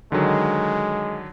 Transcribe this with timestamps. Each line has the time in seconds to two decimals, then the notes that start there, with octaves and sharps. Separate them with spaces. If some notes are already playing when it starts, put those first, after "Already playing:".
0.12 D3 D#3 F#3 G#3